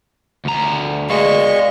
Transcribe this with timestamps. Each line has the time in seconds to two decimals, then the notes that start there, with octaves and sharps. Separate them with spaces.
0.45 D2 A#5
1.10 G#3 D5 F5 C#6